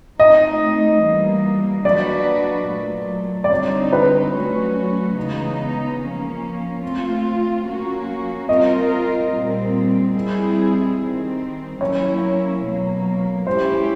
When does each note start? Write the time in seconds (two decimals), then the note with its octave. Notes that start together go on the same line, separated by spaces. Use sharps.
0.19 A3 C4 D#4 D#5
1.02 E3 G3 A#3
1.85 F#3 A#3 D4 F#4 B4 D5
2.68 A#2 F#3 A3
3.44 D5
3.51 D3 G3 C4 D#4 C#5
3.93 B4
4.34 F#3 A3 C#4 F#4
5.17 C#3 E3 G#3 B3 D#4
6.00 F3 A#3 C#4
6.83 A3 C4 F4
7.66 F#3 A#3 C#4 F#4
8.49 G3 C4 F4 A#4 D#5
9.32 A#2 G3 C4
10.14 G3 C4 E4 G#4
10.98 D#3 G3 C4
11.81 F#3 A#3 C#4 E4 C#5
12.64 B2 F#3 A#3
13.46 G#3 C#4 E4 G4 C5